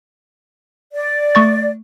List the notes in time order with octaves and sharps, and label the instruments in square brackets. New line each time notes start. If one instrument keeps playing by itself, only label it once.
[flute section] D5
[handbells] A3 C#6 A6